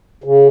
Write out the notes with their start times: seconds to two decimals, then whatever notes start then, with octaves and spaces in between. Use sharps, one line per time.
0.24 C#3